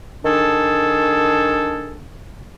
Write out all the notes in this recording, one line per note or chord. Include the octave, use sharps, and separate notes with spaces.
D#3 D4 G#4 A4